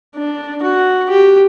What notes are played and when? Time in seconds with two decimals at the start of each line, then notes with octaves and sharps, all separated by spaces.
0.15 D4
0.63 F#4
1.10 G4